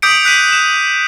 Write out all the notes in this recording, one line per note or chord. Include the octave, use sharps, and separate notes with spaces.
D6 D#6 G6 B6 C#7 D7
F#6 B6 D#7
E7